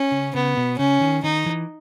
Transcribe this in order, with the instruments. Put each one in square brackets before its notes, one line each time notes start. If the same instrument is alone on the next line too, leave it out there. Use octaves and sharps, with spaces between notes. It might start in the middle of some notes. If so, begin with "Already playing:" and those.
Already playing: [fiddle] C#4
[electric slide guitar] C#3
[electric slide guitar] C#3 [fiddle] B3
[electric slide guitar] B2
[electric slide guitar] C#3 [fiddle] C#4
[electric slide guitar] D#3
[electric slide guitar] D#3 [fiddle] D#4
[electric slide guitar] E3